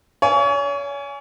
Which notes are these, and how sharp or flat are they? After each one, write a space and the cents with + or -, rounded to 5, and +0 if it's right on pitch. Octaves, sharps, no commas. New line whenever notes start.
C#5 +35 F5 -30 G#5 +0